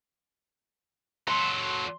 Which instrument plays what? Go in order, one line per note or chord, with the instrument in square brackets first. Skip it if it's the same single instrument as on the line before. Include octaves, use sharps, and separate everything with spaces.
[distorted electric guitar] F#3 A4 [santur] C6